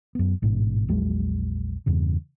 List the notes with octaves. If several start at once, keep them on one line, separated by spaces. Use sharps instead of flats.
F#2 B3
A1 G#2 B2
A#1 E2 F#3 G#3
E2 G2 C#3